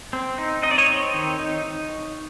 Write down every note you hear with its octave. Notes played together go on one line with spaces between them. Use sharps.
C4
D#4
D#4 D#5
D5
C#5 D#5
C4
D#3
D#4